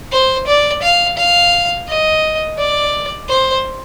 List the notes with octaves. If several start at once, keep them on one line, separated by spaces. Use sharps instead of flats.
C5
D5
F5
F5
D#5
D5
C5